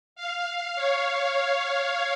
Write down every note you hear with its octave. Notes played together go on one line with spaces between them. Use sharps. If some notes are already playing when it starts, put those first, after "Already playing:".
F5
C#5